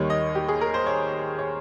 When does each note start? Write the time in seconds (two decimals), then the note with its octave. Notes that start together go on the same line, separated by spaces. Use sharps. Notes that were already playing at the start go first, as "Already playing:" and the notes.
Already playing: D#2 D#3 G3 C#5
0.10 D#5
0.35 G4
0.48 G#4
0.61 A#4
0.74 C5
0.87 C#5
1.39 C#5